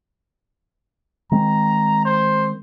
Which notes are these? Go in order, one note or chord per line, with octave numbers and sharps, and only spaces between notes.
D#3 G#3 C4 A#5
C5